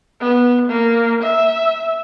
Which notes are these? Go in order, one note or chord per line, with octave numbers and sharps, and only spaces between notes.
B3
A#3
E5